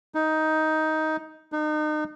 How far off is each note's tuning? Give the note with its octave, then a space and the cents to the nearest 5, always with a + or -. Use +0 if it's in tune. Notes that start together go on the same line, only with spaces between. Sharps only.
D#4 +10
D#4 -35